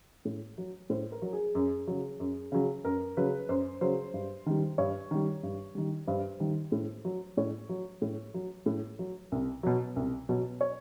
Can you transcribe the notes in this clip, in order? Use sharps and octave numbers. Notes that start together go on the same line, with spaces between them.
A2
F#3
A2 C5
A#4
F#3
G#4
F#2 G#4
C#3 F#3
F#2
C#3 F#3
F#2 A#4
C#3 F#3 B4
F#2 C5
C#3 F#3 C5
G2
D#3 G3
G2 C#5
D#3 G3
G2
D#3 G3
G2 C5
D#3 G3
A2
F#3
A2 C#5
F#3
A2
F#3
A2
F#3
C2
B2 F#3
C2
B2 F#3
C#5